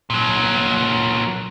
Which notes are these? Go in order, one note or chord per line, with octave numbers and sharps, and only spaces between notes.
A#2 F#3